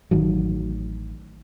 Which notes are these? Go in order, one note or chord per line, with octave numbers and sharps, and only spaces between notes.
A1 D#3 F#3